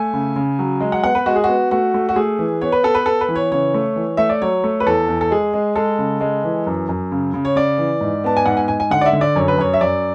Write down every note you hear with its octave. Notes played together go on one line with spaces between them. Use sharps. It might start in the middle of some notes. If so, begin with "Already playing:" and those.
Already playing: A3 G#5
C#3
C#3
F#3
G#3
F#5
B3 F#5
B4
G#3 F#4
G#4
B3 F#4
A3 F#4
A3
F#4
A3 G#4
E3
B3 C#5
B4
B3 A4
B4
B3 A4
B4
E3
C#5
C#3 C#5
A3
E3
A3 E5
D5
F#3 C#5
A3
B4
E2 A4
E2
A4
G#3 G#4
G#3
G#3 A4
C#3
G#3
E3
F#2
F#2
C#3
C#3
C#5
C#3 D5
E3
G#2
B3 A5
G#5
G#2 F#5
G#5
G#2 G#5
G#5
D3 F#5
D5
E5
D3
D5
F#2 C#5
B4
F#2 C#5
E5
F#2 D5